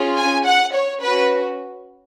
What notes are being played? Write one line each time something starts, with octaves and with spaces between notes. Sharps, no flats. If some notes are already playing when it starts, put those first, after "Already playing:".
Already playing: C#4 F4 G#4
G#5
F#5
C#5
C#4 F#4 B4